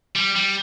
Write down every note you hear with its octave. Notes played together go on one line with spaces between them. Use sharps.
G3
G3